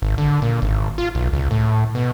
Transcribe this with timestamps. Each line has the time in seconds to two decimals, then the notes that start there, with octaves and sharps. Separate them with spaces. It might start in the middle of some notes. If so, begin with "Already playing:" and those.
0.02 G#1
0.18 D3
0.42 A#2
0.62 G#1
0.98 F4
1.15 B1
1.33 C#2
1.51 A2
1.95 B2